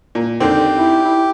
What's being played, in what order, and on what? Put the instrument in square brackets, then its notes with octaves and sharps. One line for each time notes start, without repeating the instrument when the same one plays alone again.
[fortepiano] A#2
[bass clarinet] F2 [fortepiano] D3 D#3 C4 [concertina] G4
[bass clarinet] E4
E4